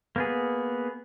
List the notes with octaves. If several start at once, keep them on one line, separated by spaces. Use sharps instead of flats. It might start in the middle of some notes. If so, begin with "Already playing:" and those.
A#3 B3 G#4